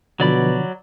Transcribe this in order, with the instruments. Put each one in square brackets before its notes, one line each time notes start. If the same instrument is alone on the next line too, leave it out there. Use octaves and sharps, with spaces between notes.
[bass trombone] B2 [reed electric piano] D3 F3 [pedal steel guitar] F#3 D5 B5